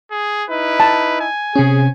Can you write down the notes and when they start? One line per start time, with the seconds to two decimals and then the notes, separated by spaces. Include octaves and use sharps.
0.11 G#4
0.50 D#4 E4 B4
0.80 A5
1.20 G#5
1.56 C3 C#4 G#4